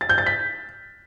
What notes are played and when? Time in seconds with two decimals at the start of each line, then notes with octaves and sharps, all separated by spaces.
0.01 A6
0.09 G6
0.18 A6
0.26 B6